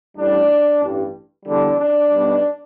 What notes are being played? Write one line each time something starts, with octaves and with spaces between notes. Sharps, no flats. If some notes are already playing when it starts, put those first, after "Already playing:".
A1 A2 G3 D4
A1 G2 G3
E2 D3 G3 D4
D4
B1 B2 G3